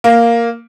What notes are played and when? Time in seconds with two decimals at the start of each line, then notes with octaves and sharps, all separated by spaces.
0.04 A#3